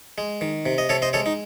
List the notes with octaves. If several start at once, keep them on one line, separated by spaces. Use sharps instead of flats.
G#3
D#3
C3
D#5
C3 A4 C#5
C5 D#5
G#3 A4 C#5
D#4